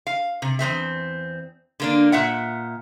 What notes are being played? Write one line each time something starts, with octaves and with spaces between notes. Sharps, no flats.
F5
C3
E2 G#3 C4 E5
D3 A#3 D4
A#2 E5 F#5